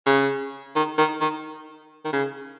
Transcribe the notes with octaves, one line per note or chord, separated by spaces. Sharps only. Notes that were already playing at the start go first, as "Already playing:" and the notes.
C#3
D#3
D#3
D#3
D#3
C#3